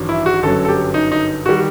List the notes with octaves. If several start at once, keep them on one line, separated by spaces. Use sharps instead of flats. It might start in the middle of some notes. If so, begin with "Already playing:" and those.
Already playing: A1 G2 D#3 F#3
E4
F#4
G1 F#2 F#3 A4
A4
G4
D#4
D#4
D#3 G3 F#4